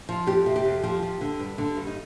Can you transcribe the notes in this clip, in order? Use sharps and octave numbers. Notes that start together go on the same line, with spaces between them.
F3
F2 G4
C3
G4
F2
F3 G4
F3
D3
G2
D3
G2
D#4